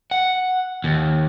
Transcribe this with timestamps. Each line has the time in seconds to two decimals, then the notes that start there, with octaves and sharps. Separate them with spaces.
0.11 F#5
0.84 D#2